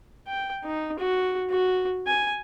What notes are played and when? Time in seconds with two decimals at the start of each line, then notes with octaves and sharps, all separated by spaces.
0.27 G5
0.64 D#4
0.99 F#4
1.50 F#4
2.07 G#5